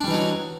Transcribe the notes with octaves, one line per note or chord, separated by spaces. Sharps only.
E3 F#3 G3 D4 D#4